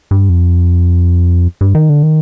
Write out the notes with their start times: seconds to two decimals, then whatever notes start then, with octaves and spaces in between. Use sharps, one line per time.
0.11 G2
0.29 F2
1.61 G2
1.75 D#3
1.89 D3
2.03 D#3